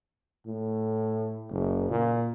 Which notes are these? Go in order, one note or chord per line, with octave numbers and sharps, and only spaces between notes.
A2
F#1
A#2